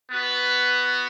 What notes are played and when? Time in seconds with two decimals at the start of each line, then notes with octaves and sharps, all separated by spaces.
0.11 B3 F#4 B4